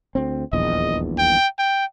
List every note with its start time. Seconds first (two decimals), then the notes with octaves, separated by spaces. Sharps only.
0.15 D2 C4
0.53 D#1 A#1 E2 D#5
1.18 G5
1.59 G5